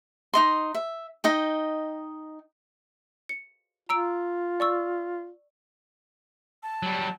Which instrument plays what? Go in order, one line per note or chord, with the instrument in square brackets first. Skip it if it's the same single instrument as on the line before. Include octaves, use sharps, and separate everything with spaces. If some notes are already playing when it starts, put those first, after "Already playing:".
[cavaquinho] D#4 D#5 C6
E5
D#4 D#5 G5
[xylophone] C#7
[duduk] F4 [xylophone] A#5 E6 D7
[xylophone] D5 C#6 E6
[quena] A5
[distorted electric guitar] F#3 G3